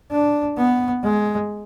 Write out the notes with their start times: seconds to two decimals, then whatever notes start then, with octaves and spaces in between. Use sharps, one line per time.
0.11 D4
0.57 B3
1.04 G#3